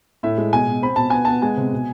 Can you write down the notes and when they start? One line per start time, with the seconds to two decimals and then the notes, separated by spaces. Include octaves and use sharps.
0.23 A2 E5
0.38 G#3
0.53 B2 G#5
0.68 B2
0.83 C4 B5
0.96 B2 A5
1.10 B3 G#5
1.25 B3 A5
1.42 G#3 G#5
1.57 C3
1.72 B2